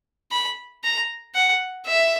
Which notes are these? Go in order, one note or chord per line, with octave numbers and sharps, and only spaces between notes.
B5
A#5
F#5
E5